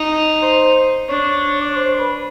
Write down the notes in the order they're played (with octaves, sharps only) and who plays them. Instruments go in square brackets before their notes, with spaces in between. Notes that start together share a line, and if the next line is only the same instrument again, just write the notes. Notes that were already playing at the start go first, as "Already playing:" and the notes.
Already playing: [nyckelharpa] D#4
[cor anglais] C5
[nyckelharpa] D4 [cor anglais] C#5
[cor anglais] D5
C#5
C5
B4